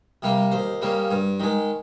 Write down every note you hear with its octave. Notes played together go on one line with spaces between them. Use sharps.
C3 G3 A#3
D#2 C5
C#3 G3 A#3
G2
D#3 G#3